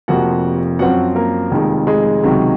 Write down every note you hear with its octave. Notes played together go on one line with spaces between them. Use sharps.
F1 F2 C3 F3 A#3 F#4 F#5
F#2 F3 C4 F#4 F#5
A#3 A#4
F1 F2 D#3 G#3
G#3 G#4
C#2 C3 D#3 F#3